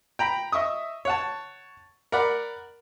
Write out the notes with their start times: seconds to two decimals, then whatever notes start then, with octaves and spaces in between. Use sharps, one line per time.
0.19 G5 A#5 B5
0.52 D#5 E5 C#6 D#6
1.05 C#5 F#5 A5
2.12 A#4 D5 F#5 B5